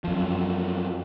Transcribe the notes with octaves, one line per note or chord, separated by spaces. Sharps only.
F#2 F3